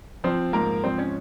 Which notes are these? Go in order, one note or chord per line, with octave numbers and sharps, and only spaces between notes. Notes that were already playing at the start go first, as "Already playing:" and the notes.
F3 C4 C5
G#2 A#3 A#4
F3 C4 C5
C#4 C#5